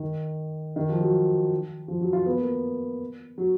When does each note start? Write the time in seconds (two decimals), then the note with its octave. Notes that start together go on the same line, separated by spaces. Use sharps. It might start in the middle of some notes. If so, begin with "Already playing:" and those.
Already playing: D#3
0.76 D#3
0.89 F3
1.01 F#3
1.88 F3
2.01 F#3
2.13 F4
2.26 B3
2.38 A#3
3.38 F#3